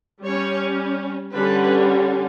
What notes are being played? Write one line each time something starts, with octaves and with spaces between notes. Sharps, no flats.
G3 C#4 C#5
D3 G3 C#4 B4